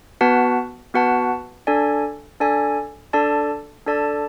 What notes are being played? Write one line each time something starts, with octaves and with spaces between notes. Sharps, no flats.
B3 F#4 B4 F#5 A5
B3 F#4 B4 F#5 A5
D4 A4 D5 G#5
D4 A4 D5 G#5
D4 A4 D5 A5
D4 A4 D5 A5